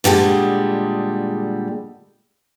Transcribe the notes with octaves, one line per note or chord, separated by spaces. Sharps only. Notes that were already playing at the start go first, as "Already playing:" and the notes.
A#2 D3 G3 G#3